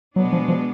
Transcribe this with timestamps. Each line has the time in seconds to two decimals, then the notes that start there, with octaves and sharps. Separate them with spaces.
0.16 B2 F#3 G#3 B3 D4
0.33 F3
0.48 F3